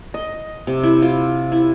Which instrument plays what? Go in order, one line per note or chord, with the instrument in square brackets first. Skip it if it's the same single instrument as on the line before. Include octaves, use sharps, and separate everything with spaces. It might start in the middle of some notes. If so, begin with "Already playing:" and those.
[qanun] D#5
C3
E4
F4
E4